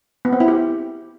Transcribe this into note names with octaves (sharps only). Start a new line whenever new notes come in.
B3
C4
E4
G4